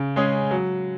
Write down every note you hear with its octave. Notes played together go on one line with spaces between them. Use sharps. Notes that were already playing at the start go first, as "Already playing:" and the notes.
Already playing: C#3
G#3 C#4 G#4
F#3